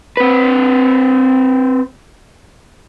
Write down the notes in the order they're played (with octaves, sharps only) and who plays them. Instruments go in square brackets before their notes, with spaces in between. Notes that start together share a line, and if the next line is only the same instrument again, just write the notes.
[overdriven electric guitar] C4 B4